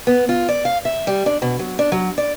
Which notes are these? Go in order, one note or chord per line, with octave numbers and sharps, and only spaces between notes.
B3
F4
D5
F5
E5
G3
D4
B2
F#3
D4
F#3
D5